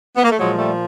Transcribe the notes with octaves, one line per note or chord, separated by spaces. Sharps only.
B3
A#3
A3
A#2 F3 F#3 G#3
G3 A3